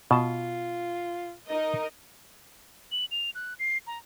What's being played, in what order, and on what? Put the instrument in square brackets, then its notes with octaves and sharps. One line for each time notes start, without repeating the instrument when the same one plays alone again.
[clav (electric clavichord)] B2 A5 [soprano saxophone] F4
[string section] D#4 A#4 D#5
[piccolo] F#7
F7
F#6
C7
A#5